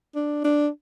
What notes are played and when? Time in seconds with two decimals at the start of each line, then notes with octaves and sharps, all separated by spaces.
0.15 D4
0.44 D4